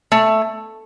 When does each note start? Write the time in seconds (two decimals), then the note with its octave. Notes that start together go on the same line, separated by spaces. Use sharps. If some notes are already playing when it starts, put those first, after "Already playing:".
0.12 A3